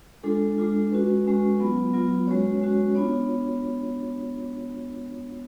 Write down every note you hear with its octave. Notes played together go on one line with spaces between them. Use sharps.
G#3 D4 F4 A4
G#3 D4 F4
G#3 C#4 F#4 B4
G#3 C#4 F#4
F#3 B3 F4
F#3 B3 F4
G#3 C#4 F#4 C#5
G#3 C#4 F#4
B3 D4 F4 C#5